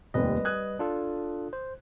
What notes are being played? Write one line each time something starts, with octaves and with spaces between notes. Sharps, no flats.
F1 D#2 G3 B4 D#5
D#6 F#6 G#6
D4 F4 A4
C5